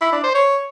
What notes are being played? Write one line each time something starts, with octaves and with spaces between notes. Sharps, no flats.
E4
D4
C5
C#5